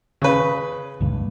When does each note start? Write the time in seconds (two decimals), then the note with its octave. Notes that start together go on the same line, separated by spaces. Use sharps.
0.22 C#3 B4
1.01 C#2 G2 A#2